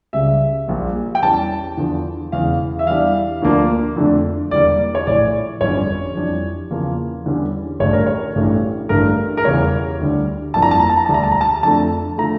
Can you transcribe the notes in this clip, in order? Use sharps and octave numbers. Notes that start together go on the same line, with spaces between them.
C#2 C#3 G3 E5
A#1 A#2 G3 A#3
G5
E2 E3 G3 C#4 A5
E2 D3 F3
E1 E2 C#3 E3 F5
E5
E2 E3 G3 D4 F5
D2 D3 F3 A#3 D4
F2 D3 A3 D4
E1 E2 D3 G3 A#3 D5
C#5
A#1 A2 E3 D5
G1 F2 D3 G3 C#4 C#5
F2 E3 G3 D4
E2 C#3 F3 A#3
E2 D3 G3 C#4
A1 G2 D3 A3 D4 C#5
A#4
C#5
A1 G2 E3 A3
A1 G2 D3 A3 A#4
A#4
E1 E2 C#3 G3 C#5
D2 D3 G3
G1 F2 E3 A#3 D4 A5
A#5
A5
A#5
A5
A#5
E1 D2 D3 G3 D4 A5
A#5
A5
A#5
A5
F2 D3 A3 D4 A5
D3 F3 A3 A#5